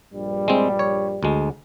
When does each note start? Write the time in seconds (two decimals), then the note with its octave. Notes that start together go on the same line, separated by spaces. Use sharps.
0.13 A#1 G2 G3
0.48 G#3 C4
0.79 C#5
1.23 D2 G#3